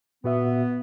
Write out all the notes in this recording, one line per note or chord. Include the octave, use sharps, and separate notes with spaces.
A#2 B3 F#4 E5